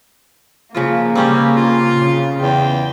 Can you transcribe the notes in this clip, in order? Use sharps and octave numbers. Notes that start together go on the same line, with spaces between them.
C#3 F3 A#3 F4
C#3 G3 C4 C#4 G4
F4
C#3
E2 G5